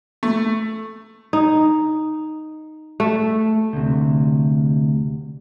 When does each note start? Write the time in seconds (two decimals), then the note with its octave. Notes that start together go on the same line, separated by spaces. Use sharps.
0.23 A3
1.33 D#4
3.00 A3
3.73 D2 C3